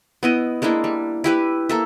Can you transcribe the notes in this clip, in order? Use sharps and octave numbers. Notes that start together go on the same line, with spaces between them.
B3 E4 D#5
G#3 A#3 D4 E4
G3
E4 G4 B4
A#3 A4 E5